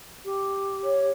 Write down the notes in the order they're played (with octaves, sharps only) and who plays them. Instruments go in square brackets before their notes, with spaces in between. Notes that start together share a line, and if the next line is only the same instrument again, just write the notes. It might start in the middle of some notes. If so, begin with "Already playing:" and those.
[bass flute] G4
[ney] C#5